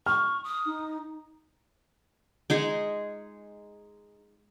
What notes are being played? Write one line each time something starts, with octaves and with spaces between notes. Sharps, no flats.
C#6 F6
D#6
D#4
G#3 D#4 G#4